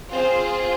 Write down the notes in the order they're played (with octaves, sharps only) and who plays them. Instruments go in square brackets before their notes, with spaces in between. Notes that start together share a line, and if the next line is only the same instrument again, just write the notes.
[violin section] C4 F4 G#4 C5